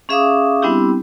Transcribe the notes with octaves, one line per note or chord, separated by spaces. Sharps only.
C#4 G#4 E5 F5 D6 D#6
G3 B3 C4 D4 E4 G4